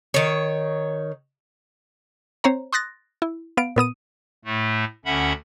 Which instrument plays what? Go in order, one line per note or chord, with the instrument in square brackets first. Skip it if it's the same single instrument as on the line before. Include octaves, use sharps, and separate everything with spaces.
[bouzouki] D#3 C#5
[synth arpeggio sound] C4 C5 C#5 A#5
C6 D#6 F#6 A6 A#6
E4
B3 F5 D7
A#2 B3 D#6 D#7
[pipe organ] A2 A3
D2 D3 C#4 E5 F#5 B5